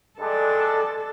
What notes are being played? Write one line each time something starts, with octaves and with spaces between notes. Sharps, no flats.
G2 G#3 D4 A4